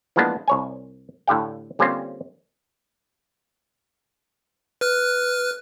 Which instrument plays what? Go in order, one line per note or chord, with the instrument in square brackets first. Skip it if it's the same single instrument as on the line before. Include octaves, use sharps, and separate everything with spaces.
[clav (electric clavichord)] E3 F3 G#3 A#3 B3 D4
C2 C#5 G#5
A2 D3 G4 F5 G5
D3 G3 A#3 C4 C#4 F4
[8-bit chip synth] B4 F6 F#6